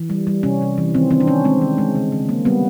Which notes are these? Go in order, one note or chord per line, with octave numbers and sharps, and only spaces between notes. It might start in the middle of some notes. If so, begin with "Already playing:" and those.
Already playing: E3
G3
G3
C3 C#4
C3
E3
D#3 C4
D#3 C4
D4
D#3 C#4
G#3 C4
D#3
G#3
C#3
C#3
A#3
G3 B3